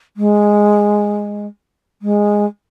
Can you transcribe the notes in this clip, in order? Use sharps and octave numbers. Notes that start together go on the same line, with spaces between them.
G#3
G#3